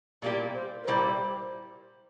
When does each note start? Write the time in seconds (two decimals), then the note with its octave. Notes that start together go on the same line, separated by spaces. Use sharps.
0.22 A#2 G3 A#3 E4 G4 D5
0.54 C5
0.84 A#4
0.87 A#2 G3 A#3 E4 G4 C5